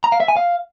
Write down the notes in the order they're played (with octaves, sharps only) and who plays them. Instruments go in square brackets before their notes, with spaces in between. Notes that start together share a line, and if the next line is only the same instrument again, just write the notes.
[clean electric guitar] A#5
F5
E5
G#5
F5